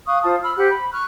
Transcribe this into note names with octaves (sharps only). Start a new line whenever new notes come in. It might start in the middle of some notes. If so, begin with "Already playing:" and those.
F5 C#6 D#6 F#6
F4 C5 A5 D#6
B5 E6 F6
G4 C5 F#5 F#6
B5
C#6 F6 F#6